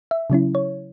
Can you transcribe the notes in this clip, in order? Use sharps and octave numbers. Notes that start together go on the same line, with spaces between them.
E5
C#3 F#3 C#4 E4
C#5